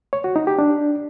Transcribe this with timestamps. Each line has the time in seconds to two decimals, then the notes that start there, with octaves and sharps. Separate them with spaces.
0.13 C#5
0.24 F#4
0.36 D#4
0.47 G4
0.59 D4